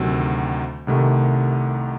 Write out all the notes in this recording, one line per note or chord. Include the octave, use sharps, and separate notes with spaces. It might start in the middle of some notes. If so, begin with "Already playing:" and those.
Already playing: D2 C3 D#3 F#3 C4
C2 C3 D#3 A3